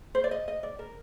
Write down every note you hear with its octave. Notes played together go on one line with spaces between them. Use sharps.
C5
D5
D#5
D#5
D5
A#4